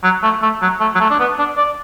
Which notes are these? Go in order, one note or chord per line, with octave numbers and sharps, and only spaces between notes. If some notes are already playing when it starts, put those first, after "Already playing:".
F#3
A3
A3
F#3
A3
F#3
A3
D4
B3
D4
D5